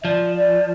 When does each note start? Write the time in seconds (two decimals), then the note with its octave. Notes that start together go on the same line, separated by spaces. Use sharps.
0.01 E5
0.05 F3 D5
0.35 D5